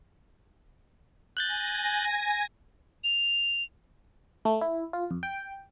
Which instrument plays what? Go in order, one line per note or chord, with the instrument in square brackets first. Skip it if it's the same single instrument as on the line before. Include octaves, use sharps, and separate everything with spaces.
[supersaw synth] G#5 A#6 [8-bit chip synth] F#6 G6 A6
[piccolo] F7
[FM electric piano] A3
E4
F4
F2
G5